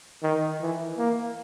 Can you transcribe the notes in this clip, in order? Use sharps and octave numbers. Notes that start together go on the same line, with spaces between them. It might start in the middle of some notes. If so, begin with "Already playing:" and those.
D#3
E3
A#3